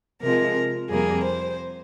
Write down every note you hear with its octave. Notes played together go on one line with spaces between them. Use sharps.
C3 F3 G#3 A#4
F2 C3 G3 A#3 G#4
C5